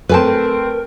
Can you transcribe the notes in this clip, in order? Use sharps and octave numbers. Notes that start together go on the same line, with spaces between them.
A3 C4 A#4 B4 G#5 A5